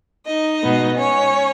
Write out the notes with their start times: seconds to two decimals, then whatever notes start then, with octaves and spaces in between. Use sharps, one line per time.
0.26 D#4 D#5
0.61 B2 G#3 B3
0.97 C#4 C#5